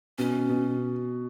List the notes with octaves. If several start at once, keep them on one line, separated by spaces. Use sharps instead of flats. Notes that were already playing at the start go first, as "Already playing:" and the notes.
B2 C#4
B2